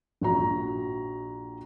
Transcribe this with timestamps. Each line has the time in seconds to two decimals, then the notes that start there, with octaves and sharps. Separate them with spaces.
0.21 A#1 F#4 A#5